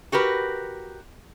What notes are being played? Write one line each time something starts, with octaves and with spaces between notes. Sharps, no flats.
F#4 G4 A#4 B4